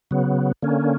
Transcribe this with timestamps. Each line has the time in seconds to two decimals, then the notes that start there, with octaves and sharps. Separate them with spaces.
0.11 C#3 F#3 B3
0.62 D3 A#3 C#4